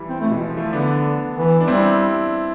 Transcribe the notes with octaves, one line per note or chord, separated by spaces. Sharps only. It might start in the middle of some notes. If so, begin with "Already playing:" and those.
Already playing: E3 G3
C4
A3
B2 E3
F3
F3 A3
D3 B3 D4
E3
D4
G3 C4 E4